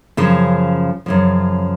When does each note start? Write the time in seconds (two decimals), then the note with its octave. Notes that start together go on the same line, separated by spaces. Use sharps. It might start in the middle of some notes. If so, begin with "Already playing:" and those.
0.17 F#2 C#3 F3
1.06 F#2 C#3 F3